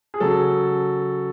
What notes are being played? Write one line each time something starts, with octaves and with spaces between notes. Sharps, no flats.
G#4
C#3 F#3 A4